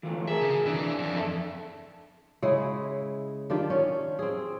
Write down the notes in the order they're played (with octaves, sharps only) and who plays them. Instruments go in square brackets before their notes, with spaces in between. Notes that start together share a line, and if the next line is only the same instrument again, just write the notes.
[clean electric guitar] E3 F3 A3
[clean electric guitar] G#4 A#4 [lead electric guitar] E5
[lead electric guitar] C#3
[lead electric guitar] E3 [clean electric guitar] D4 E4
[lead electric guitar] F2
[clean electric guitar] A4 E5
[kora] C#3 G#3 E4 G#4
D#3 D4 F4 G4
C#4
C4 G#4